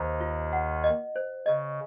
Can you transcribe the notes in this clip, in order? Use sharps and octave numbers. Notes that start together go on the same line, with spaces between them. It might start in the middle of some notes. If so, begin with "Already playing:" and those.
Already playing: D#2 D#3 C5
F4
F#5
D#5
C5
C#3 D#5